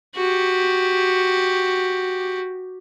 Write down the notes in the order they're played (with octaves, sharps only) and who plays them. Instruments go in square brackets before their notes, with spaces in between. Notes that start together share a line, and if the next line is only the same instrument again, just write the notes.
[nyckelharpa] F#4 G4